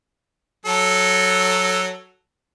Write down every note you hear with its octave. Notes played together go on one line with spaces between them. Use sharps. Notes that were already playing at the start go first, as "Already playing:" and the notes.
F#3 A4